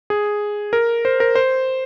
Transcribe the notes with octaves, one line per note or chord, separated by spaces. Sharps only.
G#4
A#4
C5
A#4
C5